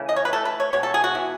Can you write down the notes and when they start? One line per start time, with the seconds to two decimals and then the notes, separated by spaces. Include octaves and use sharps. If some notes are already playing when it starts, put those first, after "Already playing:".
Already playing: C#3 E3 A3
0.09 D#5
0.16 C#5
0.25 B4
0.33 E3 A3 A4
0.45 B4
0.60 C#5
0.73 B2 G#3 C#5
0.83 A4
0.94 G#4
1.04 F#4
1.15 E3 B3